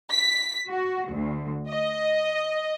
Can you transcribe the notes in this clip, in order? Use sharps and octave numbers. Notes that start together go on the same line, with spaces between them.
B6
F#4
D2
D#5